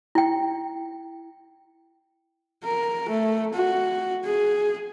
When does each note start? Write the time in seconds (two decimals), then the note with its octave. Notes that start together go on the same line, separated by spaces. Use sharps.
0.15 E4 G5
2.65 A#4
3.09 A3
3.54 F#4
4.25 G#4